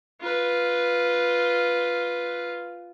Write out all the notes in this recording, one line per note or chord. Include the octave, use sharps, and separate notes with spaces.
F4 B4